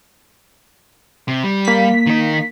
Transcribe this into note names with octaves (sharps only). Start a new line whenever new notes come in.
C3
G3
A#3 B6
D#3 D#4